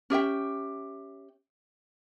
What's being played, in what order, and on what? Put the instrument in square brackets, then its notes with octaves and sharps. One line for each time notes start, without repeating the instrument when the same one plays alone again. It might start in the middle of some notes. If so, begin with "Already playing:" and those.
[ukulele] C#4 G4 E5 G5